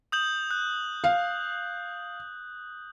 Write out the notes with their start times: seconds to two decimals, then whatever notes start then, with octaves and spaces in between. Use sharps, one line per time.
0.12 D#6 G6 F#7
0.51 F#6
1.04 F5